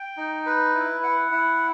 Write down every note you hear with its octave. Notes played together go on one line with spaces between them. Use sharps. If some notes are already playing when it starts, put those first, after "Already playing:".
Already playing: G5
D#4
B4
E4
F#5
E4